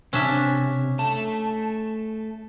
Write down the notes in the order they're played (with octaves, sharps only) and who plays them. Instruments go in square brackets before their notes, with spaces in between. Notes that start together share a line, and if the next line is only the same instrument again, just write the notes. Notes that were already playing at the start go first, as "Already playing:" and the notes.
[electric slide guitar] C3 [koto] C#4 D4 E5
[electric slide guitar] A3 A5